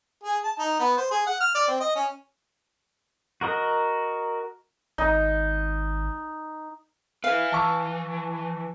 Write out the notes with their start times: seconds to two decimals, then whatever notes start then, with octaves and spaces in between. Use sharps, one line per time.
0.24 G#4
0.44 A5
0.59 D#4
0.79 B3
0.97 C5
1.11 G#4
1.27 F#5
1.40 F6
1.55 D5
1.68 C4
1.80 D#5
1.96 C#4
3.41 F#4 A#4 D#5
4.98 G#1 D#4
7.24 B4 E5 F5
7.52 E3 A5 C#6 E6